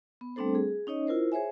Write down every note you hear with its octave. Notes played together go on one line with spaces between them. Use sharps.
B3
G3 A3 C4 D4 A4 C5
G#4
C#4 D#4 C#5 D#5
E4 F4 A#4 C5
G#4 C5 C#5 E5 G#5